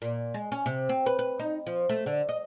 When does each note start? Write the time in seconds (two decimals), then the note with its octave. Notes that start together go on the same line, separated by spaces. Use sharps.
0.02 A#2
0.34 G#3
0.52 C#4
0.66 C3
0.89 C4
1.06 B4
1.19 B4
1.39 D#4
1.67 F3
1.89 A3
2.06 D3
2.29 D#5